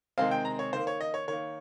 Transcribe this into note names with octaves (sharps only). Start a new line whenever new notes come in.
C3 D#3 G#3 C4 F5
G5
A#5
C#5
D#3 A#3 C5
C#5
D#5
C#5
D#3 A#3 C#5